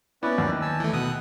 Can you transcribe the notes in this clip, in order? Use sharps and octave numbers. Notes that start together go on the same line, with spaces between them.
B3 C#4 E4 B4 D5
D#2
G#5 A5 E6
E3 A3
B2 B3 D#6 F#6